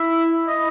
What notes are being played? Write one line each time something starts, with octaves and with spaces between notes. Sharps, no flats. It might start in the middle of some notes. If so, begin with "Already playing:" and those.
Already playing: E4 E5
D#5